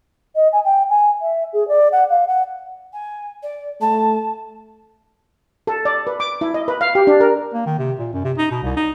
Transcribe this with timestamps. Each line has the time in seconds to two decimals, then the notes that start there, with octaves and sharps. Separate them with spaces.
0.36 D#5
0.53 G#5
0.65 G5
0.90 G#5
1.22 E5
1.53 G#4
1.68 D5
1.92 F#5
2.10 F5
2.27 F#5
2.93 G#5
3.42 D5
3.81 A3 A5
5.67 A4
5.85 D5
6.07 B4
6.20 D6
6.41 E4
6.54 D#5
6.68 B4
6.81 F5
6.95 G4
7.07 D4
7.21 A#4
7.54 A#3
7.66 D#3
7.79 C3
7.99 A#2
8.13 F#2
8.25 C3
8.38 D#4
8.51 B2
8.63 C2
8.77 D#4